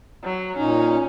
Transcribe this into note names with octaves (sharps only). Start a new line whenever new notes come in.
F#3
A#2 C#4 D#4